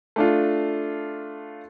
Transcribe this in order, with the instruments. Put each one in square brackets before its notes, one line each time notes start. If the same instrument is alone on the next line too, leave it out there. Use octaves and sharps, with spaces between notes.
[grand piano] A3 D4 F4